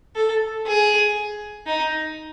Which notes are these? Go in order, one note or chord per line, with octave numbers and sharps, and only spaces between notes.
A4
G#4
D#4